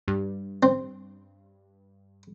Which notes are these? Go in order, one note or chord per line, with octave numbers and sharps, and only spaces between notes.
G2
C4